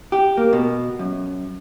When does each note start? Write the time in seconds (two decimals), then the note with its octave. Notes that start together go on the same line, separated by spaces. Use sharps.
0.12 G4
0.37 A#3
0.53 B2
0.99 F#2